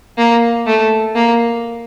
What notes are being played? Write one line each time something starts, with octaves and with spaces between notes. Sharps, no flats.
A#3
A3
A#3